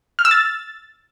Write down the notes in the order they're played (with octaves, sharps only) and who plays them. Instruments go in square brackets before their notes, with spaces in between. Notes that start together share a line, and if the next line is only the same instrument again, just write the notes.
[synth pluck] F6
E6
A6